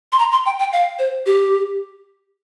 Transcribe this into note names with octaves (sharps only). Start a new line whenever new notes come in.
C6
A#5
C6
G5
G5
F5
C5
G4